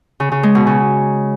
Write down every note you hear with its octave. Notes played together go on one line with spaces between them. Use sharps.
C#3
C#3
G#3
B2
C#3